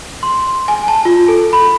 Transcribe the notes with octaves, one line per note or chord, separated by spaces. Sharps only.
C6
G#5
A5
F4
A4
B5